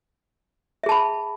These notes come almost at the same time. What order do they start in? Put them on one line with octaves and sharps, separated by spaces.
E5 G#4 A5 B5